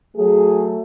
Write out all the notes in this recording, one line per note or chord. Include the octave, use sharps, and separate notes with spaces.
F#3 A3 G#4